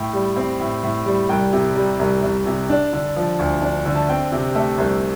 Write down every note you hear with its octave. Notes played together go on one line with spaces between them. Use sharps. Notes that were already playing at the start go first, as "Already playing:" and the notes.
Already playing: A2 G5
G3
C4
A2
A2
G3
C2 G5
C3
G3
C2
C2
C3
D4
D3
F3
D2
D4
D3
A5
C4 G5
C3 G4
A3 A4
C2 C5